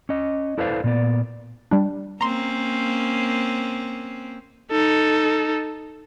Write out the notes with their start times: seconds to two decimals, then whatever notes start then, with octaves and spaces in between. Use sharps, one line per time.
0.09 C#4 D#5
0.58 E4 A4 B4 C5 D5 F5
0.84 A#2 B3 D5
1.71 G3 D4
2.21 A#3 C4 C#4 A#5 C6
4.71 D#4 A4